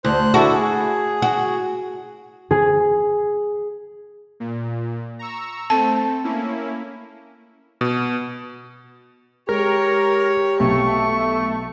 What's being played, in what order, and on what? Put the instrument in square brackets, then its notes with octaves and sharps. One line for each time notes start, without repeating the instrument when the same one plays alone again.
[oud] D2 [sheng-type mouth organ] C5 F#6
[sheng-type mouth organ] D4 E4 A4 [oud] F#4
[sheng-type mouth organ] G#4
[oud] F#4
[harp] G#4
[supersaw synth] A#2
A#5 C#6 E6
[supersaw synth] A3 C4 A4 [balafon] A5
[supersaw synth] A#3 C#4 E4
[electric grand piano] B2
[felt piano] G#3 [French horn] G4 [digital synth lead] A#4 [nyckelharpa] C#5
[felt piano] B1 [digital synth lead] A3 [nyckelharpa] C#6